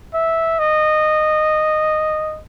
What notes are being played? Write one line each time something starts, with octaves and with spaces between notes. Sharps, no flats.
E5
D#5